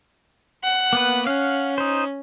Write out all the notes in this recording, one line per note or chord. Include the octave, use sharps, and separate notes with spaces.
F#5
A#3 B3 B4
C#4 F5 F#5
D#4 C5